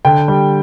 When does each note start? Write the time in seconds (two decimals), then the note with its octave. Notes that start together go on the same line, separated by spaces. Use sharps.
0.05 D3 G5
0.28 G3